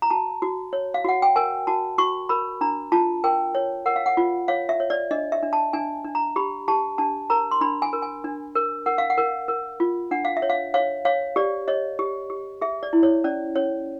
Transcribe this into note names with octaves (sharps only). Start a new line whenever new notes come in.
A#5
F#4 A5
F#4
C#5
F5
F#4 F#5
G5
A#4 G#5
F#4 A5
F#4 C#6
A#4 B5
D4 A#5
F4 A5
A#4 G5
C#5
A#4 F#5
F5
F#5
F4
C#5 F5
E5
C#5
D5
D4 D#5
E5
D4
A5
D4 G#5
D4
A#5
G4 B5
G4 A5
D4 A5
A#4 A#5
C6
D4 B5
G#5
A#4
G#5
D4
A#4
A#4 F#5
F5
F#5
A#4
A#4
F4
D4 F#5
F5
E5
C#5
F5
C#5 F5
C#5 F5
G4 D5
C#5 D#5
G4
G4
G#4 E5
D5
E4
C#5
C#4 D5
C#4 C#5